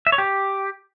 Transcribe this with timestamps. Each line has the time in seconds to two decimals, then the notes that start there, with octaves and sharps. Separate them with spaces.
0.07 E5
0.12 C#5
0.18 G4